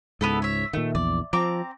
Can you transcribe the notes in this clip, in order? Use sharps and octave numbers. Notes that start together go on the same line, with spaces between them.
C#2 G#2 B3 E4 A4
C#5 E5
A#2 D#3 A3
A#1 E2 D5
F3 C4 A#5 D6